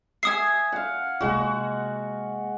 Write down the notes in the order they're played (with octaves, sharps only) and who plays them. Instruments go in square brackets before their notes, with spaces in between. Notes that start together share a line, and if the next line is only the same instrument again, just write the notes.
[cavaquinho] E5 G#5 [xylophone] D#6 C7
[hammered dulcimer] F5 F#5
[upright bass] C3 A#3 [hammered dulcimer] G#3 F#4